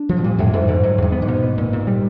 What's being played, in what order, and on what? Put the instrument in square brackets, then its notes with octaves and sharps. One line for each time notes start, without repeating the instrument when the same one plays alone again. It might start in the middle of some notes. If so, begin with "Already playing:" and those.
Already playing: [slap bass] D4
F3
[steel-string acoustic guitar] B2
[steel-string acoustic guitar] A#2 [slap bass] G3
[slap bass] F2 [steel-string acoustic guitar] A2
[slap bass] F2 [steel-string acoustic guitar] G#2
[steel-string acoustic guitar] G#2 [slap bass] D3
[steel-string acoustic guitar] G#2 [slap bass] F#3
[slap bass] E2 [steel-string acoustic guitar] G2
[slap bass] B3
[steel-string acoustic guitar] G#2
[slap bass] B2
B3
A#2
A#2
G3